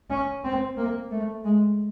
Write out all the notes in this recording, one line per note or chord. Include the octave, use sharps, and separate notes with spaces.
C#4
C4
A#3
A3
G#3